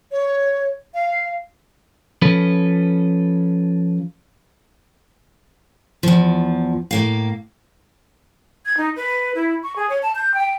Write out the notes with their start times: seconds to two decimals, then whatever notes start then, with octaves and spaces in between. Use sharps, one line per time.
0.12 C#5
0.94 F5
2.22 F3 C#4 A4 B4
6.03 E2 F3
6.91 A2 A#3 F5
8.66 G#6
8.77 D#4
8.96 B4
9.35 E4
9.63 C#6
9.76 G#4
9.89 C#5
10.03 A5
10.15 G6
10.34 G5